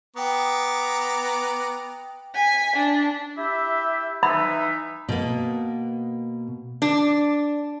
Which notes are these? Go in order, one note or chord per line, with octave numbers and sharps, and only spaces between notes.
B3 G5 A#5 D6 D#6
G#5 B6
D4
E4 G4 E5
E3 D#4 E5 B5
B2 A#3
D4